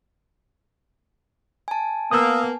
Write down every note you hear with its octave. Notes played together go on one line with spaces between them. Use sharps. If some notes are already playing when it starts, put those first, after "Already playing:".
G#5 A5
A#3 B3 D#6 E6